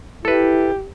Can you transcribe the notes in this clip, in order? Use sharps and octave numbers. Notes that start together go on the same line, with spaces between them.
E4 G4 A4 B4